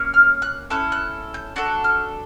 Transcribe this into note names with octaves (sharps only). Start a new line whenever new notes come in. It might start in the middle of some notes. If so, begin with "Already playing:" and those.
Already playing: A#3 C#4
F6
F#6
C#4 E4 A4 F#6
F#6
G6
D4 F#4 A4 F#6
F6